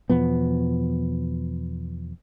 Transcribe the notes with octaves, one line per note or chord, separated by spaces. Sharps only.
E2 B2 F3 B3